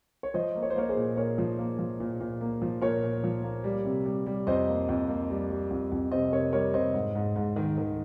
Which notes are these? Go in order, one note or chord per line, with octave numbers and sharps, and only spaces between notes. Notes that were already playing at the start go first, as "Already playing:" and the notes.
C#5
F3 C5 D#5
A#3
C#5
C5
A#3 A#4 C#5
G#4 C5
A#2
A#2 A#4 C#5
F3
A#3
F3
A#2
A#2
A#3
F3
A#2 A#4 C#5
A#2
F3
A#3
G3
C3
G3
G3
F2 C5 D#5
A#3
F2
A#3
G3
G3
F2
F2
C3 C5 D#5
C3 A#4 C#5
G3 A#4 C#5
C3 C5 D#5
G#2
G#2
G#2
D#3
D#3